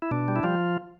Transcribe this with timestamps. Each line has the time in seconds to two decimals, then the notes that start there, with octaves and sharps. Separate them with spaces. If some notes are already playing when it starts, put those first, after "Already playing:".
0.02 E4
0.11 B2 D4
0.28 G3
0.36 E4
0.43 F3 G3 F4